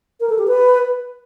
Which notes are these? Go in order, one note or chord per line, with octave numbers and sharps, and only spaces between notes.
A#4
A4
G4
B4